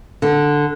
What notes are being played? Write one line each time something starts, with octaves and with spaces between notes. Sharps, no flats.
D3